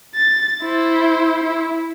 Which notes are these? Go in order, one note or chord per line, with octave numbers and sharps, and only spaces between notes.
A6
E4 C5
E4